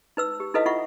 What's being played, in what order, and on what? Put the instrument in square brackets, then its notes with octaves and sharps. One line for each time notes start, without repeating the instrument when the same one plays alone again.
[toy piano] D#4 B4 E6
G4
D#4 E4 A4 B4 D#5 F5
D#4 F4 E5 F#5 C#6